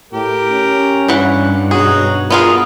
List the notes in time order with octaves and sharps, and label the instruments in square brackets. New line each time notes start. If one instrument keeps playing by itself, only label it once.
[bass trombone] A2 [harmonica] G4 A#4
[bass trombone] C#4
[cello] G2 [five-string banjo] E3 F#5
[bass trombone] B2 [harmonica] D#4 F#4 C#5 [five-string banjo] G#4
[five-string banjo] B3 F4 G#4 [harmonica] A#4 F5